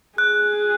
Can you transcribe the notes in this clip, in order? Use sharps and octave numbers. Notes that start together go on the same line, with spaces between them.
G#4 F#6